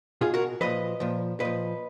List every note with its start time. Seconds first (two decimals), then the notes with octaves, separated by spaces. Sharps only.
0.21 B2 F4 G#4
0.34 F#4 A#4
0.61 A#2 F3 B4 D#5
1.00 A#2 F3
1.40 A#2 F3 B4 D#5